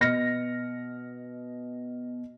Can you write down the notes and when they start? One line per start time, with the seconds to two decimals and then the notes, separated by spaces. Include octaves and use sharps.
0.01 B2 D#5 F6 A#6 C#7